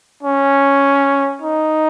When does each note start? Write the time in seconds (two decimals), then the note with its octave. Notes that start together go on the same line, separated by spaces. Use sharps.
0.23 C#4
1.42 D#4